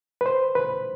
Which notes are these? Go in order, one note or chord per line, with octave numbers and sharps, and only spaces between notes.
B4
C5
B4